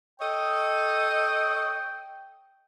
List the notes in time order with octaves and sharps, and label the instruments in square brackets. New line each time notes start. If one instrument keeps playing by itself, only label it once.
[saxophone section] A4 C#5 D#5 [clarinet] G5